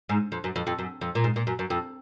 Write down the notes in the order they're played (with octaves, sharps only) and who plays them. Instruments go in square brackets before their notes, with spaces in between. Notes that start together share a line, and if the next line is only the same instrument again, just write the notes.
[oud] G#2
F2
F#2
F2
F2
F#2
F2
A#2
G#2
A#2
F#2
F#2
F2